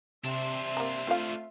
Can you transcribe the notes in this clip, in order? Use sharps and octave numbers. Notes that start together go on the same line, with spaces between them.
C3 D4 C5 E5 C6
A#3 A#5
A3 C4 F4 F5